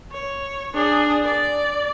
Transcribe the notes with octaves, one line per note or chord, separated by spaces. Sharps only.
C#5
D4 G#4
D5